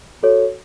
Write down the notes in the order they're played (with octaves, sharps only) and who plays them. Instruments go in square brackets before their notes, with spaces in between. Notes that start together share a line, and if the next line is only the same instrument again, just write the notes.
[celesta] F#4 A4 C#5